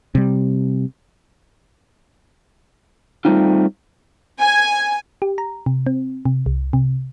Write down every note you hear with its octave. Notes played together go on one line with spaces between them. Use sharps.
C3 G3
G3 A3 C4 D#4 F4
G#5
G4
A#5
C3
C4
C3
C2
C3